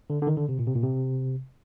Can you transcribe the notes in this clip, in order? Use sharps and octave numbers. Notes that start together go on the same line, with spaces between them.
D3
D3
D#3
D3
C3
A#2
C3
A#2
C3